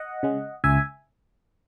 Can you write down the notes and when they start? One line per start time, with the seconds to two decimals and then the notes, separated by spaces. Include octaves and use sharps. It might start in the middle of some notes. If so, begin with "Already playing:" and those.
Already playing: D#5 F#5
0.23 C#3 G#3
0.64 C#2 E5 G#5